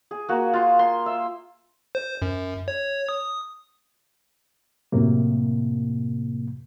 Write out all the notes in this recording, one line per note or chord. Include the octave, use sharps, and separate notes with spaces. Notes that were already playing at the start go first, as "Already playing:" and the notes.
G#4
A#3 F#4
F4 C6
C6
E5
C5
F#2
C#5
D#6
F#2 A2 C3 A#3